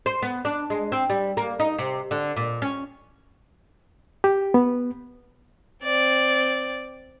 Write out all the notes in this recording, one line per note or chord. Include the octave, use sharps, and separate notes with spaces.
C5
B3
D4
G#3
C4
G3
A#3
D#4
C3
D3
A#2
C#4
G4
B3
C4 D5